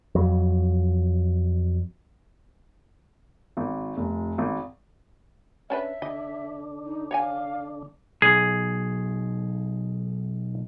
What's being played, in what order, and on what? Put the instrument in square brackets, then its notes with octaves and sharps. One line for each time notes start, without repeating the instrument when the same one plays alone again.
[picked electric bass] F2 F#3
[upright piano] G#1
F1
G#1
[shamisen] C#4 D4 B4 [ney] E5
[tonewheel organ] D3 D4 [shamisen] D#5
[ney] D#4
[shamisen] C#5 D#5 G#5 [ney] F5
[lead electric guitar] B1 [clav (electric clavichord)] G#4